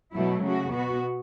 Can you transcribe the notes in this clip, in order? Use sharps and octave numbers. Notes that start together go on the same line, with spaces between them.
B2 F#3 A3 E4
C#3 A3 F#4
B2 B3 F#4